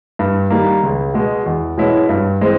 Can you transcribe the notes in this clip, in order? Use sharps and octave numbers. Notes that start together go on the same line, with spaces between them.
G2
D#3 G3 A#3
C#2
B2 G#3
E2
B2 G#3 C#4 E4
G2
E3 G#3 C4